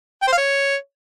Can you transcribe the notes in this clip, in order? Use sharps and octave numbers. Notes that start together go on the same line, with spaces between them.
G5
C5
F5
C#5